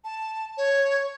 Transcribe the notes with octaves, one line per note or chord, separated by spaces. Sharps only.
A5
C#5